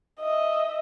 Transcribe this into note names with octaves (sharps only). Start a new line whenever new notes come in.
D#5 E5